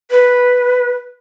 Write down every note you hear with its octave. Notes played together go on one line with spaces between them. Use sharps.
B4